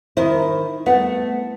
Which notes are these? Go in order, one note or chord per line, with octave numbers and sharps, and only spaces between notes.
D#3 E4 C5
A3 B3 F#5